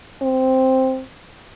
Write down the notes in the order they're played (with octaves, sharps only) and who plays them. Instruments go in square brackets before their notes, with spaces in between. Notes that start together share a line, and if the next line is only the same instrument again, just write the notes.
[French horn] C4